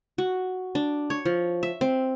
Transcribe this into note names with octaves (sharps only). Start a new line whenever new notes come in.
F#4
D4
C#5
F3
E5
C4